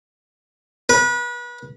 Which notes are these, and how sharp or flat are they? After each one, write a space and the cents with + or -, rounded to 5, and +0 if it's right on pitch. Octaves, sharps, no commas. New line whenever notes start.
B4 -35